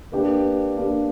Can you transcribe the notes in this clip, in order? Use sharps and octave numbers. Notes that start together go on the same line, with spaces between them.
A#3 D4 G4 B4
A#3 D4 G4 B4